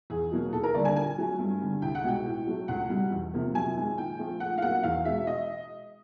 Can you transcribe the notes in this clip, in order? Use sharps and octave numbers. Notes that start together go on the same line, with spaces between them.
E2 G#4
B2 F#3 A#3
D#2 A4
A#4
D3 G3 A#3 D5
G#5
A#2 G#5
F#3 A3
G2
D3 G3
C2 G5
F#5
B2 G#3 G5
A2
F#3 A3
C#2 F#5
B2 G3
E2
C3 F3 A#3
F#2 G#5
D#3 G#3
A#2 G5
F3 A3
A#2 F#5
F5
F#3 A#3 F#5
E2 F5
B2 G#3 E5
D#5